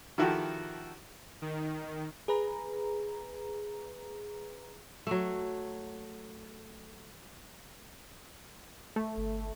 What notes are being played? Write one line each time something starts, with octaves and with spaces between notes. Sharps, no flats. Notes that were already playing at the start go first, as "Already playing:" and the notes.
D#3 F3 E4 F#4 G4 A4
D#3
G#4 B4 A#5
F#3 A3
A3
G1